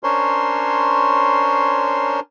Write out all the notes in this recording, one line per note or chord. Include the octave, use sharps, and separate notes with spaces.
C#4 D4 A#4 C5 C#5 C6